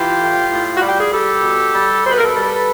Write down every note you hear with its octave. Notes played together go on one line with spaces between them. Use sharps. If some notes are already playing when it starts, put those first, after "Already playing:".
Already playing: E3 F4 G4
A2
A2
F#4
G3 G4
G#4
G3 G4 A4
B2
G3
B2 C5
B4
A#4
A4 B4
G3